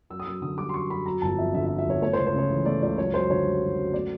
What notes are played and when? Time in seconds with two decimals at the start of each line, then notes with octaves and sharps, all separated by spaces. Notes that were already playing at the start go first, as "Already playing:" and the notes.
0.10 F#2 E6
0.20 D#6
0.26 F#2 E6
0.42 D3 D#6
0.58 G3 D6
0.69 C6
0.74 F#2 C#6
0.90 F#2 B5
1.06 F#3 A#5
1.22 G1 A5
1.38 F2 E5
1.54 D3 E5
1.66 E5
1.70 F#3
1.78 E5
1.86 G1 C#5
2.02 A3 C#5
2.13 C5
2.18 C#2
2.27 C5
2.34 C#3 C#5
2.50 E3
2.66 A3 D5
2.82 C#2 D5
2.98 F#2 C#5
3.14 F#2 C5
3.30 D3 C#5
3.46 G3
3.62 F#2
3.77 F#2
3.94 A3 D5